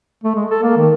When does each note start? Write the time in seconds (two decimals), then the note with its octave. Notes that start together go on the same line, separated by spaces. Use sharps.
0.24 A3
0.35 G#3
0.50 A4
0.62 A#3
0.77 D#3